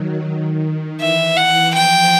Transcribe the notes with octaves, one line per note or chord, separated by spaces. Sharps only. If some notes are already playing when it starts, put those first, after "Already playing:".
Already playing: D#3 F#3
D#3
D#3
E3 E5
F#5
F3 G5